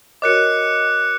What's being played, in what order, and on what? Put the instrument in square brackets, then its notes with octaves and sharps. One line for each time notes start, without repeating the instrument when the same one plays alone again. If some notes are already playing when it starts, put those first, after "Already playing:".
[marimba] F#4 A#4 C#5 [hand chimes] D#5 [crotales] D6 F#6 C#7